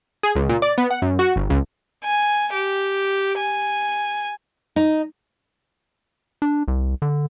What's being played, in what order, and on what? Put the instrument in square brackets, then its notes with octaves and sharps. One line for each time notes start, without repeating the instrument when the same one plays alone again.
[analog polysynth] G#4
C#2
A#2
D5
B3
F#5
F#2
F#4
G1
C#2
[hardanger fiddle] G#5
G4
G#5
[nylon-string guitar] D#4
[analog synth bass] D4
C2
D3